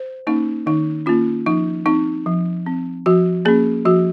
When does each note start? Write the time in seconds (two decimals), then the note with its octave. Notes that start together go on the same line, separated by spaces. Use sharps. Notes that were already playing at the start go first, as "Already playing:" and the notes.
Already playing: C5
0.27 A#3 C#4 D#4
0.66 D#3 D#4
1.06 A#3 C#4 F4
1.46 F3 D#4
1.86 C4 D#4
2.26 F3
2.66 C4
3.06 F3 F#4
3.45 A#3 C#4 G#4
3.86 F3 F#4